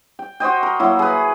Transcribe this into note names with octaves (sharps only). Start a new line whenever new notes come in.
G5
F#4 C5 D#5 G5
A#4
F#3 A#3 E4
G#4 B4